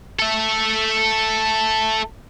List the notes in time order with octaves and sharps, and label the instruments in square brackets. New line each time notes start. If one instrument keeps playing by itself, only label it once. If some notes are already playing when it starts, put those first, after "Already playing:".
[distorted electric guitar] A4 E5